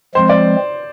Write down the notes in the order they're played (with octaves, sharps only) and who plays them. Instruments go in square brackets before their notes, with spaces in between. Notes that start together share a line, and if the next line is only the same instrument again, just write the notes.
[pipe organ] F3 G#3 C4 [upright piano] C5
[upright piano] D5